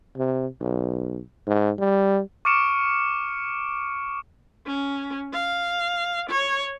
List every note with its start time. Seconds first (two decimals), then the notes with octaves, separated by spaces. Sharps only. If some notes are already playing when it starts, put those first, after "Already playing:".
0.18 C3
0.61 B1
1.47 G#2
1.79 G3
2.45 C#6 D6 F6 C#7 D7 E7
4.66 C#4
5.33 F5
6.29 C#5